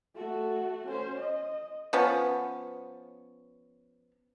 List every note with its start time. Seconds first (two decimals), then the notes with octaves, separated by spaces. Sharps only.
0.15 A3 F#4
0.87 C#4 C5
1.18 D#5
1.93 F3 B3 C#4